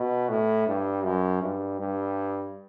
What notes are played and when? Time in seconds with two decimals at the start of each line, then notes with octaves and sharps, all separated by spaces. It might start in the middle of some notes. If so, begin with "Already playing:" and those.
Already playing: B2
0.29 A2
0.67 G2
1.05 F#2
1.42 G2
1.80 G2